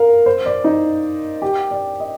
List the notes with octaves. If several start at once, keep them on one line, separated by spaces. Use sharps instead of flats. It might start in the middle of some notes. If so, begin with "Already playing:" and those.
Already playing: A#4 F5
C5
D5
D#4
G4
D5
D#5